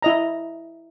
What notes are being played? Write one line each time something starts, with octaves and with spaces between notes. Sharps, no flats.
E4 D#5 A#5